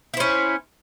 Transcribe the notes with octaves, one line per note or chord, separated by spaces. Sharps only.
C#4 E4 C5